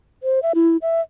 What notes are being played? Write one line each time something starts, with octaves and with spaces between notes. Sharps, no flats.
C5
E5
E4
E5